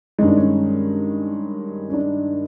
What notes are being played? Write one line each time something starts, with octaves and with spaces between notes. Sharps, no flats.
G2 D#3 G#3 C#4
D4
C#4
C#4
D4